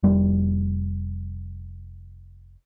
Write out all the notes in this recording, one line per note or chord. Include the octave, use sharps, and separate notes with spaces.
F1 G3